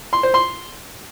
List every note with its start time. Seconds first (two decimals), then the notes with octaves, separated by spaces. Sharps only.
0.13 C6
0.23 C5
0.34 C6